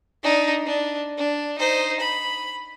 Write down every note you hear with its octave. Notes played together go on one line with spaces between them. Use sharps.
D4 D#4
D4
D4
D#4 C5
B5